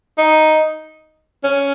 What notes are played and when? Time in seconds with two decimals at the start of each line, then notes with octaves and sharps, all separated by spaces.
0.18 D#4
1.43 C#4